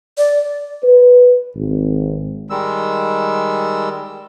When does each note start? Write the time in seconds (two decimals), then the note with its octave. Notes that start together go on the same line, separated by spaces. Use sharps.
0.18 D5
0.84 B4
1.56 G#1
2.50 D#3 G3 G#3 E6